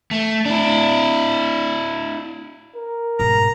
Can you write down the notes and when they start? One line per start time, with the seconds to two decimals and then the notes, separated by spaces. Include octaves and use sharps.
0.11 A3
0.45 D4 E4
2.76 A#4
3.20 G#2 B2 A#5